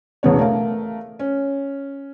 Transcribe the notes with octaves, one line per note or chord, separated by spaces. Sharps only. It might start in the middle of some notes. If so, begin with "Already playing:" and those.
E1 A1 C#3 B3 C#5
A3 A#4 F5
C#4